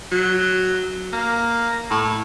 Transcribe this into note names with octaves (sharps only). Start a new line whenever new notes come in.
F#3
A#3
A2